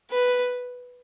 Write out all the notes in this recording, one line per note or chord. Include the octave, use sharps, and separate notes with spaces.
B4